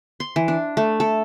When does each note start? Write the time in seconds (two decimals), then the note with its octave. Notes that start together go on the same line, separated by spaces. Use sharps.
0.20 C6
0.36 E3
0.48 D4
0.77 A3
1.00 A4